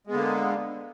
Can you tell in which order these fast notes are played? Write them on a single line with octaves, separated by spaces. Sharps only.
G#3 B3 D3 A#3